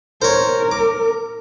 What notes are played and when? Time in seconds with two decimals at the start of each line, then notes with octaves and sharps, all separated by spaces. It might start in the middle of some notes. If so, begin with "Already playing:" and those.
0.22 A#4 C5 C#5
0.71 D6